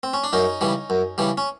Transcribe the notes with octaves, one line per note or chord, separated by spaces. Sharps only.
C4
C#4
D4
F#2 C#4 D#4
C#3 E3 G3
F#2
C#3 E3 G3
C#4